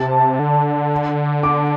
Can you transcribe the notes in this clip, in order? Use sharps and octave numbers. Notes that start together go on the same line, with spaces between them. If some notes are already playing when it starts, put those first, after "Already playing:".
Already playing: C3 A5
D3
D6